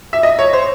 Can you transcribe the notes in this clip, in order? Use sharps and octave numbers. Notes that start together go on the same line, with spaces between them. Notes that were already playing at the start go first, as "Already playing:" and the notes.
E5
D#5
C#5
C5